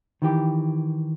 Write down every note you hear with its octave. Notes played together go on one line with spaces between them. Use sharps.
D#3 E3 G4